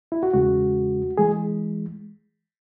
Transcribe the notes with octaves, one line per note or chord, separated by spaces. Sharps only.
E4
F#4
E2 C#3 G#3 F#4
E3 G#3 G#4